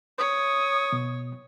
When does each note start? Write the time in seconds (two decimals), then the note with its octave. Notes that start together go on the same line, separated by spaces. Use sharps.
0.18 C#5 D#6
0.92 B2